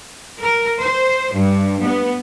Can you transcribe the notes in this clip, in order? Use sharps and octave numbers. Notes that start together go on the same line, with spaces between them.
A#4
C5
G2
B3